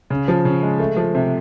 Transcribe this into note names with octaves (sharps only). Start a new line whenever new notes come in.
C#3
F3
C#3
G#3
A3
F3
C3